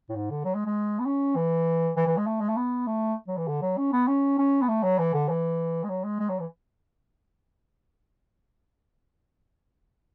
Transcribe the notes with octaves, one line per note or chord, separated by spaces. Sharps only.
A2
G#2
D3
F#3
G#3
G#3
B3
C#4
E3
E3
E3
G#3
A3
G#3
A3
B3
A3
F#3
E3
D3
F#3
C#4
B3
C#4
C#4
B3
A3
F#3
E3
D3
E3
G#3
F#3
G#3
G#3
F#3
E3